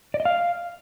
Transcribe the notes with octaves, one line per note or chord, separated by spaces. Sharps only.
D5
D#5
F5